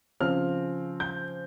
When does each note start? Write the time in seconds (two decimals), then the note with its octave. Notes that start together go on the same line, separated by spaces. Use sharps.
0.20 C#3 F3 C4 F6
1.00 G6